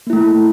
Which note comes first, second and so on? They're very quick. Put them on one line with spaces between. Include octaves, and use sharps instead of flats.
A#3 E4 A3